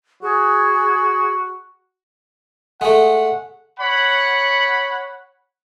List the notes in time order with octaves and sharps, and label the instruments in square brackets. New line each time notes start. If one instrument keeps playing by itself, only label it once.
[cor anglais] F#4 [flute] G#4
[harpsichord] G#3 A3 [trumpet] F#5
[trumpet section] C#5 F#5 B5